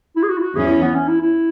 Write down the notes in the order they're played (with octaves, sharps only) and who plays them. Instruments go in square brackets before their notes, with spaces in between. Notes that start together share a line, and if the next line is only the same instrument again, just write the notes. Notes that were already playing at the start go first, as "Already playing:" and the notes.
[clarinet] E4
G#4
F#4
E4
F#4
[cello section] E2 E3 C#4 [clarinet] G#4
[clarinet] E4
B3
C#4
E4
E4